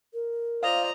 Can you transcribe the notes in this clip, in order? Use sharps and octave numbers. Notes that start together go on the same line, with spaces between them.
A#4
F4 C5 D5 D#5 F5 A#5